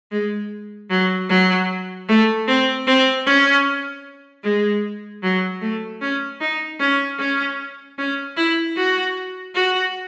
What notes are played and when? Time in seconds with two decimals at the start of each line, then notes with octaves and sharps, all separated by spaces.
0.12 G#3
0.90 F#3
1.29 F#3
2.08 A3
2.48 C4
2.87 C4
3.26 C#4
4.44 G#3
5.23 F#3
5.61 A3
6.01 C#4
6.41 D#4
6.80 C#4
7.19 C#4
7.98 C#4
8.36 E4
8.76 F#4
9.55 F#4